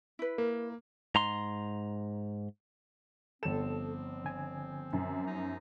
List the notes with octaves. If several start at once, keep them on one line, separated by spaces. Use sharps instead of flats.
E4 B4
A#3 A#4
G#2 A#5 C6
G1 F3 C4 A4 E7
D3 G#5
F#2
F3 B3 D#4